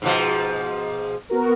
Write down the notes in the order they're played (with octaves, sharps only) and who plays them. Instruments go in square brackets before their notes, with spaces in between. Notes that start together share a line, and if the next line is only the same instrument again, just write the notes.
[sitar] G#2 B2 F3
[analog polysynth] B3 F#4 A#4